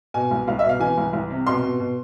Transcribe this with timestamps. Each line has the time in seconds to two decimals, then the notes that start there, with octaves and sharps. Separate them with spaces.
0.14 B2 G#5
0.31 C2
0.47 C2 F5
0.59 E5
0.63 B2
0.69 F5
0.80 E3 G#5
0.98 C2
1.13 C2
1.30 C3
1.47 B2 C6
1.62 B2
1.80 B2